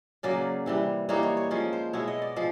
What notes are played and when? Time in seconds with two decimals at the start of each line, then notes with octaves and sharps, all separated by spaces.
0.23 C#3 F#3 A#3 C#4 D5
0.66 C3 E3 G3
1.09 E3 G3 A#3 D#4 C#5
1.23 C#5
1.37 C#5
1.51 F3 G#3 C#4 C#5
1.73 C5
1.93 B2 G#3 B3 E4 C#5
2.08 D#5
2.22 D5
2.36 F3 G#3